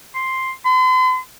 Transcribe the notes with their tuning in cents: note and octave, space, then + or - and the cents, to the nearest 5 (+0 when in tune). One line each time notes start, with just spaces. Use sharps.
C6 +0
C6 -45